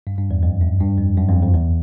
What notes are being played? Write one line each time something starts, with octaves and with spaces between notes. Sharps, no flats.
G2
G2
E2
F2
F#2
G2
F2
F#2
F2
F2
E2